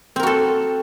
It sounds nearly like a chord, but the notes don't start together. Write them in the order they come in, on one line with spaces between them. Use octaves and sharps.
C4 A#4 F#4 A4